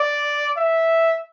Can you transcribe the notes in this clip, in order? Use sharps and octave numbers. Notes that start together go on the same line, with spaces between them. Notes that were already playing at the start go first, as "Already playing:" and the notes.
Already playing: D5
E5